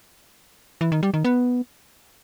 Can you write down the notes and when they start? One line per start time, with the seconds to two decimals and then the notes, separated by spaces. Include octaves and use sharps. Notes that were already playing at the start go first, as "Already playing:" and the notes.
0.81 E3
0.92 D#3
1.03 G3
1.14 D#3
1.25 B3